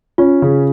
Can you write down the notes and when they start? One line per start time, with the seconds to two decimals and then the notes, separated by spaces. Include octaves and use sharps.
0.18 C#4 F4
0.42 C#3